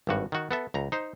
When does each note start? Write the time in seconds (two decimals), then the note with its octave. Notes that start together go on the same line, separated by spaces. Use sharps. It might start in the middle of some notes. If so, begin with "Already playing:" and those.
0.07 G#1 G2 F#4
0.32 D#3 F#4
0.51 B3 A4 E5
0.74 C#2 A#5
0.92 D#4 C5